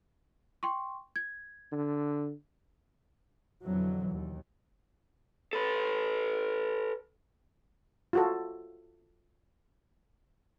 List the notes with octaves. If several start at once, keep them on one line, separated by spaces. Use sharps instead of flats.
G5 C6 C#6
G#6
D3
F2 B2 D3 E3 F#3
D#2
A4 B4
F4 F#4 A4